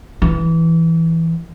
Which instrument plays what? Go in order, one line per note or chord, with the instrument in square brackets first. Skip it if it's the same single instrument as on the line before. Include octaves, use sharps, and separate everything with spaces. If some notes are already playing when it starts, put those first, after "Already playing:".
[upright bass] E3